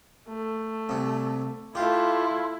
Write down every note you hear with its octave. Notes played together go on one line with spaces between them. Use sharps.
A3
C2 C3
A3 E4 F4 G4 C6